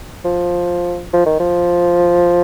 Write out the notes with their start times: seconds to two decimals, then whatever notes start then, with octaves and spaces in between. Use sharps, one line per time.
0.25 F3
1.13 F3
1.26 D#3
1.40 F3